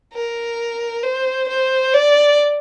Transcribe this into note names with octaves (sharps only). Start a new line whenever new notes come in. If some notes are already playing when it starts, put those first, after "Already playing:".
A#4
C5
C5
D5